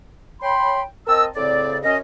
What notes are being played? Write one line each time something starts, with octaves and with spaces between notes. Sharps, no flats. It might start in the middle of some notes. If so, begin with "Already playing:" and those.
C#5 G5 B5 C6
C4 A#4 D#5 A5 E6
D2 A2 C#3 C4 D5
F#2 C#4 D#5